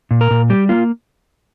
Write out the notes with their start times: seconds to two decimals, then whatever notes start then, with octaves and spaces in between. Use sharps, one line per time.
0.11 A#2
0.21 A#4
0.31 A#2
0.50 G3 G4
0.69 A#3 F4